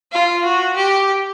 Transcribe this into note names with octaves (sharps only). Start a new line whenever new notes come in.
F4
F#4
G4